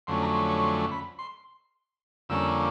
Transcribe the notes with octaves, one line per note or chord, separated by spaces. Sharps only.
F2 D3 F#3 A3 C#4 C6
A#5
C6
C#6
C6
B5
C6
F2 D3 G3 A#3 C#4 E6